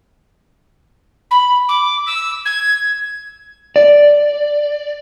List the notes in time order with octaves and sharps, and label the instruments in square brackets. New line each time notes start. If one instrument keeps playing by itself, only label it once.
[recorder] B5
D6
E6
G#6
[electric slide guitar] D5